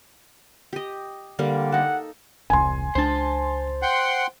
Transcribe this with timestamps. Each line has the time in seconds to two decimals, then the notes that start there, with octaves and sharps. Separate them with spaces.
0.73 G4 D#5
1.39 D3 G3 A#3
1.72 D#4 A4 F#5
2.50 E1 C2 G#5 C6
2.95 C#2 D4 C5 A5
3.82 F#5 G5 C6